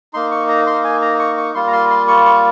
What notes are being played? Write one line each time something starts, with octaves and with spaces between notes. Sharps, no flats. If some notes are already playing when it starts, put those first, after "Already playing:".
A#3 D#4 C6
C#6
A#5
C6
G#5
A#5
C#6
C#6
G3 A#3 F4 C6
A#5
C6
C6
C#6
C#6